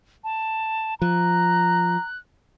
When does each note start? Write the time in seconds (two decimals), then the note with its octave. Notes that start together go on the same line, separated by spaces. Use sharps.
0.24 A5
1.02 F3 A#5 F#6